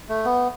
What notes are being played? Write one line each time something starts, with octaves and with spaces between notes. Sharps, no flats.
A3
B3